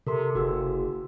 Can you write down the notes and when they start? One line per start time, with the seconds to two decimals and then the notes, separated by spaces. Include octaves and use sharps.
0.07 C3 A4 A#4 C6
0.35 F#1 F#4 G#4 E6